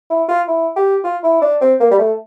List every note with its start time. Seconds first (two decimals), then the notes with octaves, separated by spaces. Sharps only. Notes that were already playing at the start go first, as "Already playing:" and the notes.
0.10 E4
0.29 F4
0.48 E4
0.76 G4
1.04 F4
1.23 E4
1.42 D4
1.61 C4
1.80 A#3
1.91 G3
1.99 A3